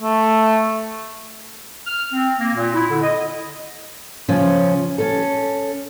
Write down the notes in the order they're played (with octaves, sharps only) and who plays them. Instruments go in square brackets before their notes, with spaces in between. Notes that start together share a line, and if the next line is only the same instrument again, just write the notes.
[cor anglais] A3
[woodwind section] F6
C4
A#3
A#2
E4
D3
D#5
[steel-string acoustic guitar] C#3 F3 C#4
C#4 A4